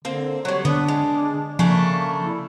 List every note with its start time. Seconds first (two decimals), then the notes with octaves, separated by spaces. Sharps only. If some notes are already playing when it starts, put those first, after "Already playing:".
0.05 D3 A#3 C4
0.45 F#3 G3 C#5
0.65 D3 B3 D4
0.88 G#3
1.59 C#3 F3 A3 A#3 D4
2.25 E4